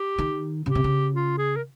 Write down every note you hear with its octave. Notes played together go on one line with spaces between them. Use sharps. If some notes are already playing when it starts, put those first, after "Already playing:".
Already playing: G4
D#3
C#3 G4
C3
C#3
F4
G#4
A#4